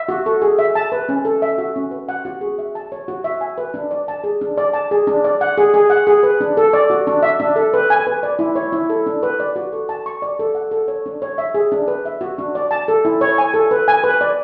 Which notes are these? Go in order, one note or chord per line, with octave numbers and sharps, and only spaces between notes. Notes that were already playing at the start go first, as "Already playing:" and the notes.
Already playing: E5
F#4
A4
G#4
E5
A5
B4
C#4
A4
E5
F#4
C#4
B4
F#5
F#4
G#4
E5
A5
C#5
F#4
E5
G#5
B4
D4
D5
A5
G#4
D4
D5
A5
G#4
D4
D5
F#5
G#4
G#4
F#5
G#4
B4
D4
A4
D5
F#4
D4
E5
D4
A4
B4
G#5
B4
D5
E4
C#5
E4
A4
D4
B4
D5
F#4
A4
A5
C#6
D5
A4
F#5
A4
C#5
D4
C#5
E5
G#4
D4
B4
E5
F#4
D4
D5
A5
A4
E4
C#5
G#5
A4
B4
G#5
B4
D5